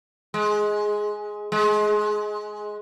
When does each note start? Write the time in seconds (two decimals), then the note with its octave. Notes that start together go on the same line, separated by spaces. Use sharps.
0.34 G#3
1.52 G#3